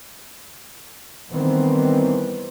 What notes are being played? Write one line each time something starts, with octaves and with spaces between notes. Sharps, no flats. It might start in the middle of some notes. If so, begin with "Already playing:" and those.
D#3 E3 G3 B3 C4